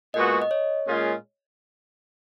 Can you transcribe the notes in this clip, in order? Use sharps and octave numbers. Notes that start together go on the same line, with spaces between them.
A#2 G#3 B3 F#4 D#5
D#5
C#5
A#2 G#3 C#4 F4 G#4